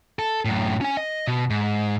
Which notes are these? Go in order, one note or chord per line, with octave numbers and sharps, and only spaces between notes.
A4
F#2 A2
C#4 G#5
D#5
B2
G#2